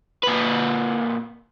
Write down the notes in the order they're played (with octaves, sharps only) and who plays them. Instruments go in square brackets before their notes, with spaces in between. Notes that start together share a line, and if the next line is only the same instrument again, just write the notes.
[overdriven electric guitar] A#2 B4